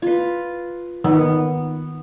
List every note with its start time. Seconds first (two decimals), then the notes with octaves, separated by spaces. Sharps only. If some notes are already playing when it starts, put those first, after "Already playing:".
0.02 F4 B4
1.04 D#3 B3